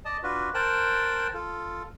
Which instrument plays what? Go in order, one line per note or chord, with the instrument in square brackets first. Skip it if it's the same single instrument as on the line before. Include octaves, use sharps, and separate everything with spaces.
[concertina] D5 D#5 A5 D#6
D4 F4 F#4 B4
A#4 C5 G5 A5 F#6
F4 A4